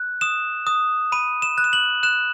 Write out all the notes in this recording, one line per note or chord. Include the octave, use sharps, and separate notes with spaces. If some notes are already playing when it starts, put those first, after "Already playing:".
Already playing: F#6
D#6 E7
D#6
B5 D#7
E7
F#6
E7
F#7
F#6 E7